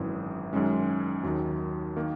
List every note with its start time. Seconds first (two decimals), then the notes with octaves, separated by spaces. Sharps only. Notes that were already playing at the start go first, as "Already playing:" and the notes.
Already playing: G#1 F#2 E3
0.53 F#2 D#3 G#3 C#4
1.23 D#2 D#3 F#3
1.96 D#3 A#3